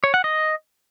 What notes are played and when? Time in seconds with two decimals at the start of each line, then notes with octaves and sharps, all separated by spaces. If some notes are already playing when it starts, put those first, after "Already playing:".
0.04 C#5
0.14 F#5
0.24 D#5